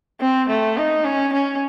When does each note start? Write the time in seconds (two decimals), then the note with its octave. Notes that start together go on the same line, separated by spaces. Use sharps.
0.21 C4
0.49 A3
0.77 D#4
1.05 C#4
1.33 C#4